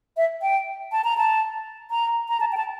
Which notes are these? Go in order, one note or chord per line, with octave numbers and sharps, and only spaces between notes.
E5
G5
A5
A#5
A5
A#5
A#5
A5
G5
A5